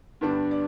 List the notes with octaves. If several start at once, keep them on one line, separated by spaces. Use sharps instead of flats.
G2 D3 G3 B3 D4
D5